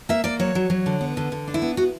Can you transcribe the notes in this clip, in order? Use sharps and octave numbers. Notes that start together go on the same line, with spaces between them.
A#3 E5
A#3 D5
F#3 C#5
F#3
F#3
D3
B3
D3
D3
D4
E4
B3
B3 F#4